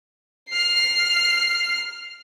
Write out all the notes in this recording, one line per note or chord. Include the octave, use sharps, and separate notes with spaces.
F6 C7